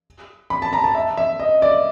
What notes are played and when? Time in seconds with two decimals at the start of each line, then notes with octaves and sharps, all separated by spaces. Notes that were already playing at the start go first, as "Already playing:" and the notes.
0.50 B5
0.62 A5
0.73 A#5
0.84 A5
0.95 E5
1.17 E5
1.40 D#5
1.62 D5